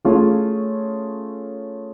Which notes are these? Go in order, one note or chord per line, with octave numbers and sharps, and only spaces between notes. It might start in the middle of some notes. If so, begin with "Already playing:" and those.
A3 C#4 F4 G#4 C#5